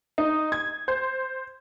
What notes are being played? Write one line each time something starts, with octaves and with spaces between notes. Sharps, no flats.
D#4
G#6
C5